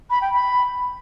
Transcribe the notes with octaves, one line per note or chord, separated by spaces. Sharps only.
B5
G5
B5